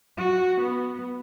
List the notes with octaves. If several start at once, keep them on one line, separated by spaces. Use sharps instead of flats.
F#4
B3